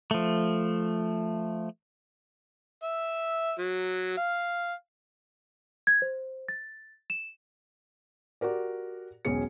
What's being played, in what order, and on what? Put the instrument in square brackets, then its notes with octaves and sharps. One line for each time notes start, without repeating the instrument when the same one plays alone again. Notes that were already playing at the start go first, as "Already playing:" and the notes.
[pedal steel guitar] F3 A3
[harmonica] E5
F#3
F5
[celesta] G#6
C5
A6
E7
[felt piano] F#4 G4 A#4 D5
E1 B1 C#4 G#4 C#7